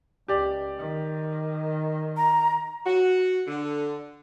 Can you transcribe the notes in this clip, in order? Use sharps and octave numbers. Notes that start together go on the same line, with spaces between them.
C#2 G4 D5
D#3
A#5
F#4
D3